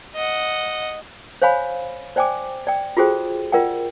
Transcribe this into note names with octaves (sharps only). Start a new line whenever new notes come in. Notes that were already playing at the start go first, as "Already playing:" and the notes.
D#5 F#5
C5 C#5 F5 G#5 B5
C5 D5 G5 G#5 D6
D5 G5
F4 F#4 G#4 A4 C5 G5
F4 A#4 D5 F#5 G5